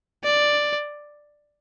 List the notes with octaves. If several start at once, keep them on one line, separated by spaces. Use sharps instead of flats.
D5